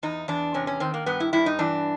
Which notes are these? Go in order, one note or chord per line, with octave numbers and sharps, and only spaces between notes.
E2 D#4
E2 D4
C3 C#4
C#4
D#3 C4
A#3
G2 B3
E4
G2 E4
D#4
E3 D4